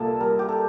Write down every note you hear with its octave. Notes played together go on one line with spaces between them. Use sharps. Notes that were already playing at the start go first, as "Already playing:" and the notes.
Already playing: C2 A#2 A#3 A4
G3 A#4
G4
A4